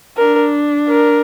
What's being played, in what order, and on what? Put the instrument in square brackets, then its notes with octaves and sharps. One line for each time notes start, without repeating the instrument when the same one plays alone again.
[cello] D4 [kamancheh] A#4
[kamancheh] A#4